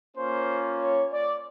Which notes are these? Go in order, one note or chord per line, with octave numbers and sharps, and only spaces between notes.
A#3 C#4 F4 C5
C#5
D5